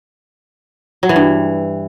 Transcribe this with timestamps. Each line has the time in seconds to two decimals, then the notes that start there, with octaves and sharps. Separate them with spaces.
1.03 F#3
1.09 E3
1.16 G2